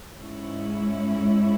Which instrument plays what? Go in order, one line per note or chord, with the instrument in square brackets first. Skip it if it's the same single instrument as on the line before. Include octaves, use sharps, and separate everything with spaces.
[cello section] G#2 G#3 C#4 E4